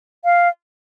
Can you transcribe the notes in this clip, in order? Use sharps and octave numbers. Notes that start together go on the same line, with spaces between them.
F5